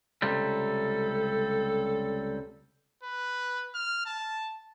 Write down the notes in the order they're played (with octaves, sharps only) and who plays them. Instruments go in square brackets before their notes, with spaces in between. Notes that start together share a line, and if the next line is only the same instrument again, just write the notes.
[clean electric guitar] C#2 C3 G3 [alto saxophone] A4
[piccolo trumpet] B4
F6
A5